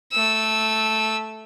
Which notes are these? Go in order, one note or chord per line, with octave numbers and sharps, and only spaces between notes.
A3 E6